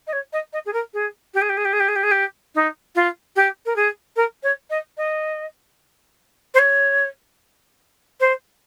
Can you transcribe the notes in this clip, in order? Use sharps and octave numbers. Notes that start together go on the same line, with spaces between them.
D#5
C#5
D#5
D#5
G#4
A#4
G#4
G4
G#4
G4
G#4
G4
G#4
G4
G#4
G4
G#4
G4
D#4
F4
G4
A#4
G#4
A#4
C#5
D#5
D#5
C5
C#5
C5